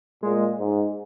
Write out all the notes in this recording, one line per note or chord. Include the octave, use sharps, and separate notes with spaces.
A#2 G#3
G#2